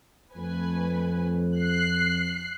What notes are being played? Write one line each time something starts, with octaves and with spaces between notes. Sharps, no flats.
F2 A3 B4 G#5
F#6 C7